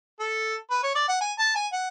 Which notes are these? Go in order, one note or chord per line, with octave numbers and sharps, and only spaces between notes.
A4
B4
C#5
D5
F#5
G#5
A5
G#5
F#5